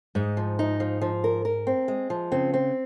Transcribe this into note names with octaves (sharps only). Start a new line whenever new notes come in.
G#2 D#4
F3
D#4
F3
F3
A#4
A#4
C4
G#3
F3
C#3 C4
C4